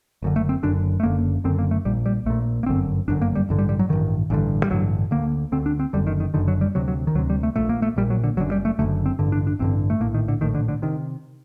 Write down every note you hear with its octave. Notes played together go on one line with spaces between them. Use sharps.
F#1 F#2 D3
A3
C4
F#1 F#2 D3 D4
A3
F#1 F#2 D3 A#3
F#1 F#2 D3 C4
A#3
A3
A#1 A#2 G3
G3
A#1 A#2 A3
A#3
G1 F#2 D3 C4
G1 F#2 D3 D4
A#3
G3
A1 G2 D3
G3
G3
F#3
A1 G2 D3 D#3
A1 G2 D3
G3
A1 G2 D3 F#3
D2 D3 A#3
D2 D3 C4
D4
C4
F#1 F#2 D3 G3
D#3
D#3
F#1 F#2 D3 D#3
F#3
G3
D2 C3 F#3
F#3
D#3
D2 C3 F#3
G3
A3
A#1 A#2 A3
A#3
A3
A#1 A#2 G3
F#3
D3
F#1 F#2 D3 F#3
G3
A3
F#1 F#2 D3 A3
C4
A1 G2 D3
D4
D4
A1 G2 D3 C4
A3
A#1 A2 A#3
D#3
D3
A#1 A2 D#3
D3
D3
C3 D#3